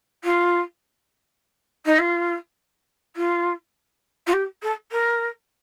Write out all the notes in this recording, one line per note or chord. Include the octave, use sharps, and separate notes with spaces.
F4
D#4
F4
F4
F4
G4
A4
A#4